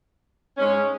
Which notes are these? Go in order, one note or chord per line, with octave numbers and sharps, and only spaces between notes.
G#2 G#3 C#4